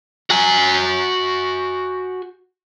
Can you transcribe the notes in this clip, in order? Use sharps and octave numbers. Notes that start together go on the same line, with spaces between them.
F#4 G#5